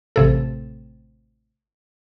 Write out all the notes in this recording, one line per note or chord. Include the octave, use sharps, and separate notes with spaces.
A1 C3 A4